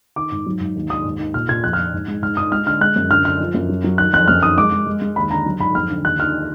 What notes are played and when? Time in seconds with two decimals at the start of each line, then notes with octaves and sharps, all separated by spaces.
0.16 D#3 D6
0.32 G#2
0.46 F#3
0.60 G#2
0.76 D#2
0.90 D#2 D#6
1.05 G#2
1.20 D#3
1.34 A#2 F6
1.49 A#2 G#6
1.64 F2 F#6
1.73 F6
1.78 F2
1.93 G#2
2.08 G#3
2.22 G#2 F6
2.37 G#2 D#6
2.52 G#3 F6
2.66 D3 F6
2.81 G#3 F#6
2.96 F#2
3.11 D3 F6
3.25 D3 F6
3.40 F3
3.54 F#2
3.69 F#3
3.84 F#3
3.98 D#3 F#6
4.13 F2 F#6
4.28 F#2 F6
4.43 D#3 D#6
4.57 G#3 D6
4.72 G#3
4.86 G#3
5.02 G#3
5.16 D#2 B5
5.31 D3 A#5
5.46 F#3
5.60 G#2 B5
5.75 F2 F6
5.90 D3
6.04 D#2 F#6
6.19 D#3 F6